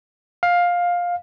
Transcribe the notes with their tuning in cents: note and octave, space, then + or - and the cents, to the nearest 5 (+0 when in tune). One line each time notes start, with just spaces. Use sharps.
F5 +15